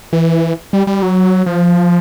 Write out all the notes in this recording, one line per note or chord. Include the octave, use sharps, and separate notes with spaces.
E3
G3
G3
F#3
F3